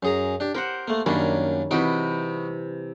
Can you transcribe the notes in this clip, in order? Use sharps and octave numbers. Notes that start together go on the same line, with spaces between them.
F#2 G#4 A#5
D4 G4
G4 A#4 C5 F#5
A3 A#3
F#2 D#3 G3 A#3 C#4 D4
C3 E3 D#4 F#4 B4 G5